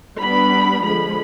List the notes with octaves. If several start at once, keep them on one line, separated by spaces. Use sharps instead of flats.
G3 B3 D4 B5
D3 F3 G#3 B5